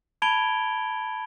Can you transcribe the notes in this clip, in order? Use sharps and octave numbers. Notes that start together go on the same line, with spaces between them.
A5 B5 G#6 D7 F7 G7